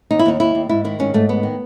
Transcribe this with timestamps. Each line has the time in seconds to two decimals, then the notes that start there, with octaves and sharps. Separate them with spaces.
0.11 D#2 D#4
0.19 E4
0.26 D#2 D#4
0.40 D#2 E4
0.55 D#2
0.69 G#2 E4
0.84 D#3 E4
0.99 G#2 C#4
1.14 G#2 A3
1.29 D#3 B3
1.43 D#3